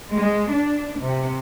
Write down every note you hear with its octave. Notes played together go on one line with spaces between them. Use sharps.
G#3
D4
C3